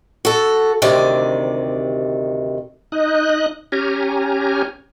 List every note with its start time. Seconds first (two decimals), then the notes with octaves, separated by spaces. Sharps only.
0.25 F#4 A4
0.82 D2 C3 D#3 D5
2.92 D#4 D#5 F#6
3.72 C#4 G4 G#5 A#5